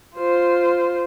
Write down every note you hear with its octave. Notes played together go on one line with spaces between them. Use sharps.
F4 C5